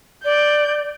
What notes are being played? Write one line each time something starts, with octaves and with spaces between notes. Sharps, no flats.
D5 G6